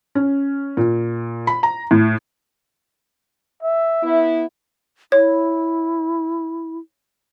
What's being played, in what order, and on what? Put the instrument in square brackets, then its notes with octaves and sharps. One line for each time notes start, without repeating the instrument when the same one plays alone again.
[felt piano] C#4
A#2
B5
A#5
A2
[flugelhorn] E5
[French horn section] B3 E4
[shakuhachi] E4 [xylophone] C#5